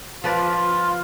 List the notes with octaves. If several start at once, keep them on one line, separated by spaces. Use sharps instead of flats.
F3 F4 B4 D5